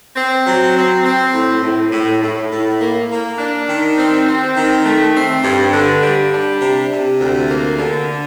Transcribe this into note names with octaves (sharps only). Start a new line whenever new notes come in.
C4
F#3
C4
C4
A2
A2
A2
A2
A2
A#3
A#3
D4
D#3
C4
C4
D#3
A3
C4
G2
D3
G3
D4
C3
C3
D2
A#3
D3